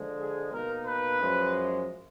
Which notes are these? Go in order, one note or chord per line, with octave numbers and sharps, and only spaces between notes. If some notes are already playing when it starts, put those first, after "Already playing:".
Already playing: D3 F3 G#3
G#4
B2 A#3 D#4 A#4
B4
F#2 F3 G#3